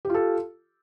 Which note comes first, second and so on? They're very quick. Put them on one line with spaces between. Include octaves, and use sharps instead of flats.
G4 F4 A4